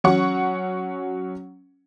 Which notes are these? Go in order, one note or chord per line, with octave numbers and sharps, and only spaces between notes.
F#3 C#4 F#5 C#6